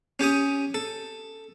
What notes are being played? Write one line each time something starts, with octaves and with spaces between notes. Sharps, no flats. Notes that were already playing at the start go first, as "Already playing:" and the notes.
C#4 G4 G#5 D#6
A4